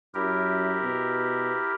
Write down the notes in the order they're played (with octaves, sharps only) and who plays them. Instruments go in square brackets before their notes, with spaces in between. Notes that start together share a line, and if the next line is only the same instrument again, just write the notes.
[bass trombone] F#2 [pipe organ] E4 G4 A#4
[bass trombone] B2